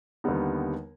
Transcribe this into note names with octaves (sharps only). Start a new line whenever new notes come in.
D#2 D3 G3 B3 D#4